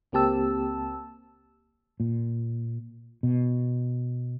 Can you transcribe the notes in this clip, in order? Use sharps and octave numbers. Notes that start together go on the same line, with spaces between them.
C#2 A#3 C4 G4 A5 E6
A#2
B2